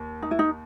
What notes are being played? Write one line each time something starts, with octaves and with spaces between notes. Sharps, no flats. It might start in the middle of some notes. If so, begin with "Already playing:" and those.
Already playing: D#2
D#4
E4
D#4